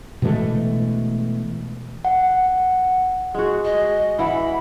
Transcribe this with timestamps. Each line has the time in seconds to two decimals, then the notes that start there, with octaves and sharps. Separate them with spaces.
0.22 B2 E3 G#3 A3
2.05 F#5
3.35 G#3 F#4 G#4
3.65 D#5
4.19 E3 F#5 B5